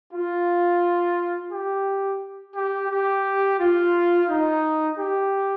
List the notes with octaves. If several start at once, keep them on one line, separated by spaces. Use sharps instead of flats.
F4
G4
G4
G4
F4
D#4
G4